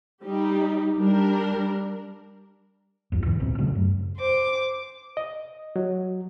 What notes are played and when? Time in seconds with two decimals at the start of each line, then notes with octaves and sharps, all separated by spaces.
0.23 G3 D#4 G4
0.99 G3 D4 A#4
3.12 A#1 E2 G2
3.26 E2 G#2 B2 E3
3.39 D1 B1 A#2 C4
3.58 A#2 C#3 F#3 A3
3.75 F#2
4.17 C5 D6
5.17 D#5
5.76 F#3